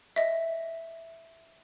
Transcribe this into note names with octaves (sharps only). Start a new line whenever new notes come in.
D#5 E5